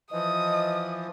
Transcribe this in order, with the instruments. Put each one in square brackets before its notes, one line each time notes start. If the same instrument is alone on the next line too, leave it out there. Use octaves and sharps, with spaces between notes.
[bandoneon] E3 F3 [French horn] D#5 [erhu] D#6